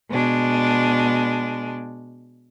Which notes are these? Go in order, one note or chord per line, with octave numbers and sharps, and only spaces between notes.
B2 G#3 D4